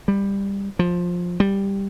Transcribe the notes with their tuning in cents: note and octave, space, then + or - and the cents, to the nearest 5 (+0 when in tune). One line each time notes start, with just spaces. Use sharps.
G3 +15
F3 +15
G3 +5